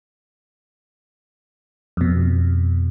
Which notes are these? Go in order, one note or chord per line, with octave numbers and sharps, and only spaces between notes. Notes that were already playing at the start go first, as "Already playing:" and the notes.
F2 B2